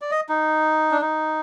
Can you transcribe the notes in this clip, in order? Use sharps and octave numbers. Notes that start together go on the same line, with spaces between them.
D5
D#5
D#4
D4
D#4